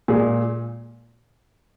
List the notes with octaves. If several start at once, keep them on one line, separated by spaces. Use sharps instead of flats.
A#2 G#3 G#4